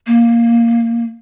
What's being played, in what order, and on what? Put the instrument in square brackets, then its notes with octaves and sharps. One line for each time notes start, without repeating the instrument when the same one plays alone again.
[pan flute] A#3